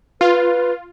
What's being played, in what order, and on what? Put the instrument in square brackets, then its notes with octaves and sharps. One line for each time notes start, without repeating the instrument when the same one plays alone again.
[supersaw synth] F4 [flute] B4